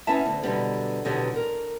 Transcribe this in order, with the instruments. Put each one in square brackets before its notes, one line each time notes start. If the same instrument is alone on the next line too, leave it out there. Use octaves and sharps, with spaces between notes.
[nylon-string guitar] B3 C#4 D#4 E4 E5 A5
D2
B2 D3 F#3 G3 B3
B2 D3 D#3 F#3 B3 G4
A#4